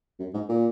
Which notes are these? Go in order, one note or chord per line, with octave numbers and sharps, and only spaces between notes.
F#2
G#2
A#2